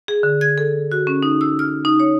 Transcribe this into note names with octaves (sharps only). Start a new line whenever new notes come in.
G#4
D3
G#6
A4
F#4
C#4
D#4
E6
F6
D#4
C#5